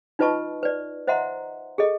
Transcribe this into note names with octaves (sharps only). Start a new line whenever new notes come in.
D#4 F4 B4 D#5 A5 C#6
B4 D5
C5 D#5 E5 F#5 A#5 C6
G#4 A4 D#5